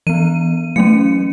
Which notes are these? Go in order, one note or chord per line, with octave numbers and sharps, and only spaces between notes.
E3 B3 D#7
F#3 A3 C#4 C#7